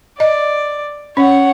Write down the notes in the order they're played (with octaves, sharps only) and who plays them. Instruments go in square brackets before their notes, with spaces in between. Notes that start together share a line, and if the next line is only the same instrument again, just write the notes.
[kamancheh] D5 [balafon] D#5
[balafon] C#4 [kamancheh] C#5 F#5